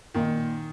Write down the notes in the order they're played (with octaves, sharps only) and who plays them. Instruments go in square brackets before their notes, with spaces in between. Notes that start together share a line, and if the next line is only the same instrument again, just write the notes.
[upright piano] A#2 A#3 D#4 [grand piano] D#3